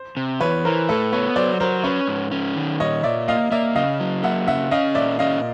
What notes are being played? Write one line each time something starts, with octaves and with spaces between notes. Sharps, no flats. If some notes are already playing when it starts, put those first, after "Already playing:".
Already playing: C5
C3
E2 B4 C#5
E3 A#4 C5
A2 A4 B4
B3 B4 C#5
F#3 C5 D5
F#3 A#4 C5
C#4 B4 C#5
G#2
C#4
D#3
A#2 C#5 D#5
A#2 D5 E5
A#3 D#5 F5
A#3 D5 E5
C#3 D#5 F5
F#3
A#3 E5 F#5
C#3 E5 F#5
C#4 D#5 F5
A#2 D5 E5
C#4 D#5 F5